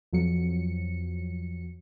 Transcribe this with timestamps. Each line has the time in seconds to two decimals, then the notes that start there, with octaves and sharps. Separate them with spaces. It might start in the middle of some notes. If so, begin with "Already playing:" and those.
0.13 F2 F#3 C#7